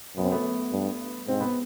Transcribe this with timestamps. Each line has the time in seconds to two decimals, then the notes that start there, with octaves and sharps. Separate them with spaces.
0.17 F#2 B3
0.24 C4
0.32 A3 B3
0.72 G2
1.28 G#2 C4
1.40 B3